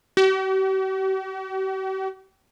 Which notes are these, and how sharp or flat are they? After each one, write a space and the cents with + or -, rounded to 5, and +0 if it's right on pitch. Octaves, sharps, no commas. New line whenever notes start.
G4 -45